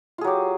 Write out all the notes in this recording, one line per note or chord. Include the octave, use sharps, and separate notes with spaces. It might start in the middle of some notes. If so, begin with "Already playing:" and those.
F#3 F4 G4 G#4